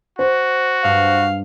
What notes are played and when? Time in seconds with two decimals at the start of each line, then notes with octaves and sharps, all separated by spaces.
0.19 F#4 C5
0.84 G2 F5